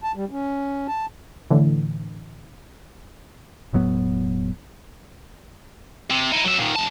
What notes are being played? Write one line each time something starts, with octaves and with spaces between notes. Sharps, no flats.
A5
G3
C#4
A5
A2 D3 E3
E1 A2 F#3 B3
C3
D#4 E4
F#3 E5
A#2 D#3
F#2 A5